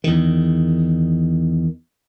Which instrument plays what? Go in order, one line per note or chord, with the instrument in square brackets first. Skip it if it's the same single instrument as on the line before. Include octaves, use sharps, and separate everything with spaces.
[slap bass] E2 D#3